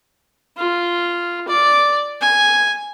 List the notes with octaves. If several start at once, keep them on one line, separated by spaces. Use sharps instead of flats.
F4
D5
G#5